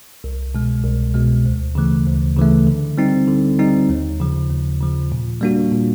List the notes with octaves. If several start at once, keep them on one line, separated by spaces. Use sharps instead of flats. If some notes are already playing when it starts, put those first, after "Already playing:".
C2
B2 G#3
C2
B2 G#3
D2
C#3 E3 A3
D2
C#3 E3 A3
D3
G3 C4 D#4
D3
G3 C4 D#4
D#2
C#3 F3
D#2
C#3 F3
A#2
G3 A#3 D4 F#4
A#2